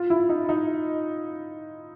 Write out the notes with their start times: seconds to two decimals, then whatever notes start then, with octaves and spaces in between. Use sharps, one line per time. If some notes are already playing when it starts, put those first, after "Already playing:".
Already playing: F4
0.10 E4
0.29 D#4
0.49 D#4